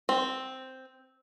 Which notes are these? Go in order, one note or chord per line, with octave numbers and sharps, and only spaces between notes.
C4